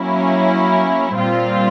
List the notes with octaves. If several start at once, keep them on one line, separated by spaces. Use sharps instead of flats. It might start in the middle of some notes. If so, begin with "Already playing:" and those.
Already playing: F#3 A#3 C#4 E4
A#2 G3 C4 F4